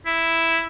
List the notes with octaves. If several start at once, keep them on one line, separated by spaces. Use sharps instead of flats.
E4